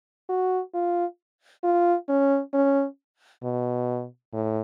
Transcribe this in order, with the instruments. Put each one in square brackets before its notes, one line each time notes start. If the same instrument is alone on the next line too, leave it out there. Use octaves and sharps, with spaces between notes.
[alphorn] F#4
F4
F4
C#4
C#4
B2
A2